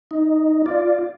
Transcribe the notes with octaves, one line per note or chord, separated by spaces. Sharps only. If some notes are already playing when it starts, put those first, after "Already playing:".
D#4
F4 D5